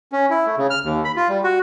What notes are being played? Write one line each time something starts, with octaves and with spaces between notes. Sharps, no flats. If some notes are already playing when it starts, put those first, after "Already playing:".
C#4
E4
A3
C#3
F6
D#2
B5
F4
G3
F#4